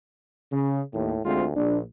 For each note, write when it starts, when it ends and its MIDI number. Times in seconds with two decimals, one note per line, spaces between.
0.52 0.81 49
0.93 1.13 39
0.93 1.21 45
1.25 1.52 38
1.25 1.45 56
1.25 1.45 60
1.25 1.45 65
1.56 1.81 34
1.56 1.77 62